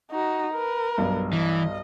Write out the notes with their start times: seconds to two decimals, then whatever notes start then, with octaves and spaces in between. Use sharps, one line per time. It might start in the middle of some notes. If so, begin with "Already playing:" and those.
0.11 D#4 F#4
0.54 A#4 B4
0.98 B1 G2
1.33 E3 D#5